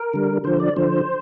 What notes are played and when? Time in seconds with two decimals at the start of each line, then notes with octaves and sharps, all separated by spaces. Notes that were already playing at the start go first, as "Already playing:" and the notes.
Already playing: A#4
0.14 D3 G3
0.44 D3 F3 C5
0.60 D5
0.76 D3 F3 C5